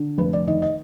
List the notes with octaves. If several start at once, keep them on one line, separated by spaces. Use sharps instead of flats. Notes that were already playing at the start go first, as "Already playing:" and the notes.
Already playing: D3
F1 B4
D5
D#3 D#5
D#5